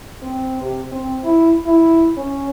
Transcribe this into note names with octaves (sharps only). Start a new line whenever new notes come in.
C4
C3
C4
E4
E4
C#4